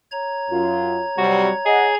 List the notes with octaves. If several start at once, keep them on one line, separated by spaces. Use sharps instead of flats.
C#5 A#5 G#6
F#2 F4
C3 F#3 G3 F#4
G#4 D#5 F#5